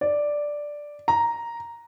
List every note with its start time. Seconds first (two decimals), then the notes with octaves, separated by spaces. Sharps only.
0.01 D5
1.08 A#5